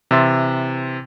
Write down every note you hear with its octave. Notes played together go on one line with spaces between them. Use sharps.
C3 E3 E5 C6 A6